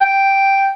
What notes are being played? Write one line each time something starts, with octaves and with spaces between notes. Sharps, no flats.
G5